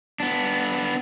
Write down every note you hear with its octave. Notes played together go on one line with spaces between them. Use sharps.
B3 D4